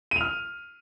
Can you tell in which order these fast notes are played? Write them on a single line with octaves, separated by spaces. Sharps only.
D#7 F7 F6